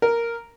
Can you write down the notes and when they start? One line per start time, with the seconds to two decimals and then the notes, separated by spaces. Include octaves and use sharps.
0.02 A#4